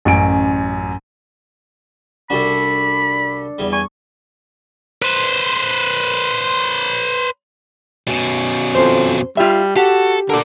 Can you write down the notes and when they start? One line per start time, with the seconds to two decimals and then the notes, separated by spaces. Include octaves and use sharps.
0.05 A1 F#2 D7
2.30 C2 G3 D4 F#4 A4 B5
3.58 E2 G3
3.73 G#5 C#6
5.02 B4 C5
8.08 B2 C#4
8.75 F2 C5
9.37 G3 F4 E5
9.76 F#4 G4 A4
10.30 D3 A#4 D5